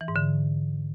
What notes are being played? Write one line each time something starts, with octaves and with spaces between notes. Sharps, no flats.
E3
G#2
D3